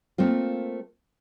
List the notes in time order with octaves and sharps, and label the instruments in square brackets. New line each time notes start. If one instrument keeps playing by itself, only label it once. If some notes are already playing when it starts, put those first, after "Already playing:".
[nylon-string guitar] A3 A#3 C4 F4